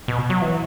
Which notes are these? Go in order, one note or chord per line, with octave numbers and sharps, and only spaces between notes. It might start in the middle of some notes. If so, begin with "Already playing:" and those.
B2
F#3
E3